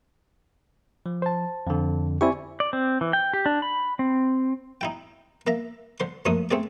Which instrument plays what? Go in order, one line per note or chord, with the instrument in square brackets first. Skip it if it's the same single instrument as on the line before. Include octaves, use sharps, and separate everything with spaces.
[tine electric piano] F3
[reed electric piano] C5 A5
[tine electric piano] F2 D3
[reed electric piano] C4 E4 G4 [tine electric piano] D5 G#5 C#6
[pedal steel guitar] D5
C4
E3
G5
G4
D4
B5
C4
[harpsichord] D#4 E4 G5
A#3 E5 A#5
D3 C5 C6
F#2 F3 A3 A#3 D4 D#6
A3 C4 G#4 D5